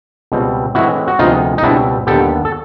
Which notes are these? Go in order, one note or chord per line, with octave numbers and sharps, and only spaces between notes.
C#2 B2 G3 C4
A2 E3 G#3 C4 E4 F#4
F#4
D2 C3 F3 G#3 B3 D#4 F4
D#4
C#2 B2 G3 C4 D4 E4
D#2 D3 G3 B3 G4 A4
A4